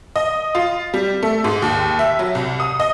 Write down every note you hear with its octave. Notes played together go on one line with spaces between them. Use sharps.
D#5
F4
G3
A3
G#2
D#2
E5
F#3
C2
D#6
D#5